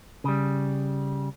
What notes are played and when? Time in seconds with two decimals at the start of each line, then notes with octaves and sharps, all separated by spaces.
0.24 C#3 G3